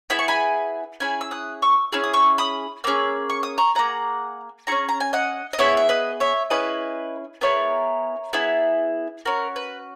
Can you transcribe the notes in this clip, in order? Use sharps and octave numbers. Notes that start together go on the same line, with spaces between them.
B3 E4 G#4 B5
C#6
G#5 B5
C#4 E4 G#4 G#5 B5
E6
D#6 F#6
C#6 E6
C#4 E4 G#4 E6
D#6
C#6 E6
B5 D#6
A#3 C#4 G#4 E6
C#6
D#6
A#5 C#6
A#3 E4 G#4 F#5 A#5
C#4 E4 G#4 A#5 C#6
A#5
G#5
D#5 F#5
D#5
B3 E4 G#4 C#5 E5
E5
B4 D#5
C#5 E5
C#4 E4 G#4 B4 D#5
B3 E4 G#4 A#4 C#5
B3 E4 G#4
C#4 F#4 A#4
B4